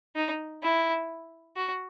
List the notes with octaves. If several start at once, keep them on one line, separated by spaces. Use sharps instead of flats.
D#4
E4
F#4